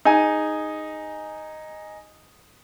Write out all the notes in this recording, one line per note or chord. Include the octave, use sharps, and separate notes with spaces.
D#4 G#4 G#5